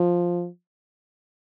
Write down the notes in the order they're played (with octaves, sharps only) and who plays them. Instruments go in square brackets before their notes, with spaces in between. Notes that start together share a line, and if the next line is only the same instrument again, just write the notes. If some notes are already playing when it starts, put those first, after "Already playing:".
Already playing: [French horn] F3